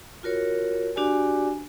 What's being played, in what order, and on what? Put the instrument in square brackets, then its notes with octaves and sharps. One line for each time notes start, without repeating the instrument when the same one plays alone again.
[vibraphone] F4 F#4 A#4 C#5
D4 F#4 G4 D5 G#5